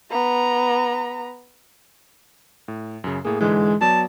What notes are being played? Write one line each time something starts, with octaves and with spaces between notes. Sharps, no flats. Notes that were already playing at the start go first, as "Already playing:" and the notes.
B3 A#5
A2
F#2 C#3
A2 A#3 G#4
G#2 D3 E3 G#3
F#3 B3 D5 A5